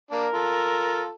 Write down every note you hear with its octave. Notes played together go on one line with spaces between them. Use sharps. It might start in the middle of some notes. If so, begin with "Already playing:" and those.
A#3 D4 A#4
F4 A4